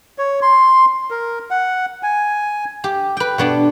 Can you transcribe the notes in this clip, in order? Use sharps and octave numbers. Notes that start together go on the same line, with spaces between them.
C#5
C6
A#4
F#5
G#5
G4
B4 G5
B2 B3 D4